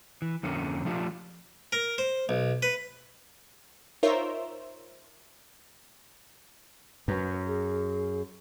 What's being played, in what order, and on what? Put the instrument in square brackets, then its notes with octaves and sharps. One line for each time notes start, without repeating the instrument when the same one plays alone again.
[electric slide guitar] E3
F2 D3 A#3 C#4
F3 A3 D4 F4 G4
[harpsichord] A#4
C5
B1
B4
[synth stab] D#4 F4 A#4 C5 C#5 E5
[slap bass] F#2 [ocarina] B4
[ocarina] G#4